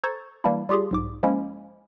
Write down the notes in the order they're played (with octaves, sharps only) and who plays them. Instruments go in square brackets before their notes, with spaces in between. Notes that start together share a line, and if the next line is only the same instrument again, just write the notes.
[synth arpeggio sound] A4 C5 A#5 C#6 G#6 A6
E3 G3 A#3 D4 E4
G3 F4 G4 G#4 C6
B1 G#2 D6
F3 G#3 A#3 C#4 E4